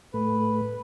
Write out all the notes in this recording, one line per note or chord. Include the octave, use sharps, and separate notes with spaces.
A2 A3 B4